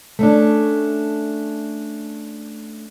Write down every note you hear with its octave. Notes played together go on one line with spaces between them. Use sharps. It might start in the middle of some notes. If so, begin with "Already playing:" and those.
A3 C#4 D4